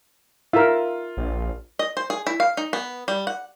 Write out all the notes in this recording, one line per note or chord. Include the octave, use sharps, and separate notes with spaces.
F4 A#4 E5
A#1
D#5
C5
G#4
E4
F5
D#4
B3
G3
F#5